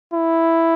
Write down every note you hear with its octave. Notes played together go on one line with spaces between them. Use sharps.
E4